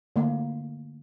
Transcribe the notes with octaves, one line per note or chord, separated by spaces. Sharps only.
D3 A3 A#3